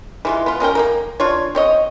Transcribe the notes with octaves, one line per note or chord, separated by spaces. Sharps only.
E3 G#3 F4
B3 F4
B2 C#4 A#4 G5
A#3 D#4 A#4
D4 F4 C#5
C4 C#5 D#5